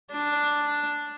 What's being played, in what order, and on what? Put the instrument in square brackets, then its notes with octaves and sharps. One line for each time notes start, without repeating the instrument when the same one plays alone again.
[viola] D4